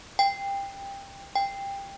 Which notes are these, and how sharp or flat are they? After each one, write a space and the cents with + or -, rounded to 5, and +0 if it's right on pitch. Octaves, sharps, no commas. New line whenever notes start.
G5 +15
G5 +15